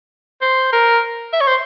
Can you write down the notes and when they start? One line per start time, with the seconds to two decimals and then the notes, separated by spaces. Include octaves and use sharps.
0.41 C5
0.72 A#4
1.33 E5
1.41 C#5
1.47 C5